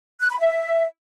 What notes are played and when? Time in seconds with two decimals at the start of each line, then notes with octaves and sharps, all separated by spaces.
0.21 F#6
0.30 B5
0.40 E5